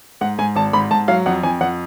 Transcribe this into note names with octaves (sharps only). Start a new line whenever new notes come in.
G#2 F#5
G#2 G#5
G#1 A5
G#2 B5
G#2 A5
F#3 F5
F2 F#5
F2 G#5
F2 F#5